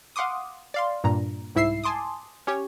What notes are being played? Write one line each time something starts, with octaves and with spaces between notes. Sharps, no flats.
F5 F#5 C6 D6 D#6
D5 F5 C6
G2 A#2 A#5
C2 G#2 E4 E5 E6 C7
G#5 A5 C6 D6 D#6
C#4 G4 C#5